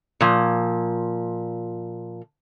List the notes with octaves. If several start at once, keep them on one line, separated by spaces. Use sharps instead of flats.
A#2 F3